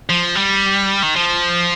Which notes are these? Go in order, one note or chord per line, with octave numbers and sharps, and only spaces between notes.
F3
G3
D#3
F3